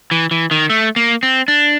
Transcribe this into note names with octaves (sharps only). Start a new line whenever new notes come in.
E3
E3
D#3
A3
A#3
C4
D4